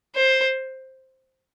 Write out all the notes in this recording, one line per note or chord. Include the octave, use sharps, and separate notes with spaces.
C5